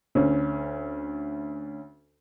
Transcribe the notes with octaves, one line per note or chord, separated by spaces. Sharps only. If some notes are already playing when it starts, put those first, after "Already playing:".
D2 C#4